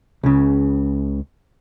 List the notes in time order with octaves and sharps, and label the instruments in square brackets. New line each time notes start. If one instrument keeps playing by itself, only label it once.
[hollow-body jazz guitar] C#2 C#3